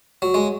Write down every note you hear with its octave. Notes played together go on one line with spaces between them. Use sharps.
F#3
G#3